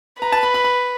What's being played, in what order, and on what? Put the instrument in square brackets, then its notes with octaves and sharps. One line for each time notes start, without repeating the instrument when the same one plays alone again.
[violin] B4 [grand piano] A#5
[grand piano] A5
B5
B5
B5